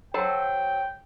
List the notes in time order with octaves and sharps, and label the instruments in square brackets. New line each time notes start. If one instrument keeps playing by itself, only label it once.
[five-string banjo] F#3 A4 C5 [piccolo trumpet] G5